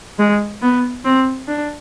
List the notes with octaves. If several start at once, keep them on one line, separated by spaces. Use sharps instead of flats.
G#3
B3
C4
D4